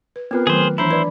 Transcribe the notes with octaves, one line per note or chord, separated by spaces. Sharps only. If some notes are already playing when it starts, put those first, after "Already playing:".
B4
B3 C4 F4 A#4 B4
D#3 F#3 A3 G#4 C5
E3 D4 E4 C5 A#5 B5
D4 B4 D5